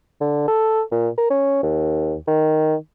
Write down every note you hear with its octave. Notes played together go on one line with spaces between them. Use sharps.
D3
A4
A#2
A#4
C#4
D#2
D#3